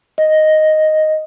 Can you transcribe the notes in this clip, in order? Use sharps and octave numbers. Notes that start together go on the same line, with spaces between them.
D#5